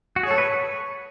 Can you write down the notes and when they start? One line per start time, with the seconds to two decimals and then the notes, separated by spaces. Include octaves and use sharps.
0.16 F#4
0.23 G#4
0.26 A4 C#5
0.38 B4